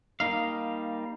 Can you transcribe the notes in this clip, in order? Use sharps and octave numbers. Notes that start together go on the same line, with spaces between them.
G3 A#3 D#4 F5